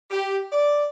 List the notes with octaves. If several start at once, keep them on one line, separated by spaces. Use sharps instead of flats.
G4
D5